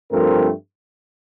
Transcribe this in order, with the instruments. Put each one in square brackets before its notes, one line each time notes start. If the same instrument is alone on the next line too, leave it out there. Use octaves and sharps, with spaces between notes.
[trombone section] G2 F3 A3 C4 A#4